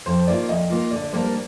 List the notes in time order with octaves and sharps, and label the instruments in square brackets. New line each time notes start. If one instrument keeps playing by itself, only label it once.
[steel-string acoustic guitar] F2 [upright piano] C5
[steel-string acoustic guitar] D#3 A#3 F4 [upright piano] D5
[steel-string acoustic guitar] F2 [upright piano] D#5
[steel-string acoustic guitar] D#3 A#3 F4
[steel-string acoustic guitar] D3 [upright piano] D5
[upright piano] D5
[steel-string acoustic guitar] G3 A#3 D4 [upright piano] C5
[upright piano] A#4